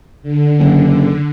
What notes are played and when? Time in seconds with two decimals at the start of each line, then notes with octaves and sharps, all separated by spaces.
0.22 D3
0.59 F#1